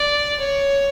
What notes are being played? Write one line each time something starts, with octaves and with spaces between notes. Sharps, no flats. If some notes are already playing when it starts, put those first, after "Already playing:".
Already playing: D5
C#5